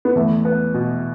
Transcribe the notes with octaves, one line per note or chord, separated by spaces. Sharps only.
B3
E2 A3
B3
B2